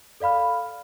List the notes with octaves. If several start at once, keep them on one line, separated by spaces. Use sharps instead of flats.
A4 D5 F5 B5 F6